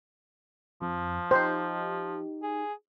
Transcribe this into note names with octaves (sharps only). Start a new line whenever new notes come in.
F2 F3
D#4 G4 C5
G#4